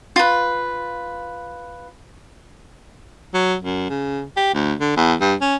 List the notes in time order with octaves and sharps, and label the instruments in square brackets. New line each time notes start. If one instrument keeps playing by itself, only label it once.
[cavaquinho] F4 B4
[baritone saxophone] F#3
F#2
C#3
G4
D2
D3
E2
G2
C#4